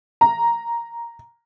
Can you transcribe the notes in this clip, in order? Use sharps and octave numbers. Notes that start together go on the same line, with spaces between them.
A#5